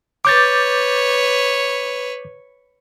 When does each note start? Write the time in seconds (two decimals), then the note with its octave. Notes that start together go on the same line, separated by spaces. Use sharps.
0.25 B4 C#5 D6 G6 A6